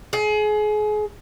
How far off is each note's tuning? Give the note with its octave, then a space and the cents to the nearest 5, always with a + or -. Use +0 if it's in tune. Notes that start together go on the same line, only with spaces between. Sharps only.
G#4 +30